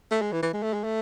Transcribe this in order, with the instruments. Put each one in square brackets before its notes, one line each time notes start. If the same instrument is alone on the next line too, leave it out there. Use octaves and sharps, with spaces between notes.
[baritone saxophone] A3
G#3
E3
E3
G#3
A3
G#3
A3